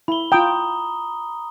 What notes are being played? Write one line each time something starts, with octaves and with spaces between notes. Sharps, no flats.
E4 B5 G7
F4 G5 A#5 D#6